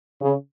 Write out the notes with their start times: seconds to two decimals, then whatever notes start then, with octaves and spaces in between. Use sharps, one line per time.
0.20 C#3